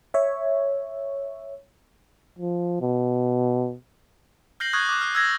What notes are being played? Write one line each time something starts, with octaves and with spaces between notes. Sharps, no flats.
C#5 E5
F3
B2
F6 G6 A#6 C7 F#7
C#6 D#6 F6 F#6 G#6
D6 F#6
F6
E6 G#6 A#6